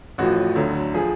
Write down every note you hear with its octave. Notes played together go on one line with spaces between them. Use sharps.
A1 A2 F3 F#4
D2 D3 F#3
F3 G#4